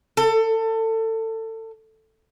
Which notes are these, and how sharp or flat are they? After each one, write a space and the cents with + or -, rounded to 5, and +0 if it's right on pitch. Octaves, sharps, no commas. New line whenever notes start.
A4 +25